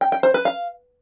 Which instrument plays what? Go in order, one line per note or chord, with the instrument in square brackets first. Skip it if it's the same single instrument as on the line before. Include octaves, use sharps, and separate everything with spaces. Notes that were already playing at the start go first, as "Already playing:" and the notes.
[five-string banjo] G5
G5
C5
B4
F5